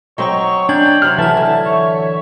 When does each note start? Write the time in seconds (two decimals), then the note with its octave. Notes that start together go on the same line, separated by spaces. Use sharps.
0.18 F#3 C4 D#4 C#5 D#5 C#6
0.69 C#4 D4 G5 A#5 G#6 F#7
1.02 C3 F#3 C5 F6
1.18 A2 E3 E5 A5 G#6
1.37 D3
1.65 C#5